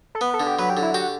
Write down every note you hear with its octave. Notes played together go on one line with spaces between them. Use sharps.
A4
B3 B4
A4
D3
G4
F#3 B4
G4
D3
E4
F#4 G4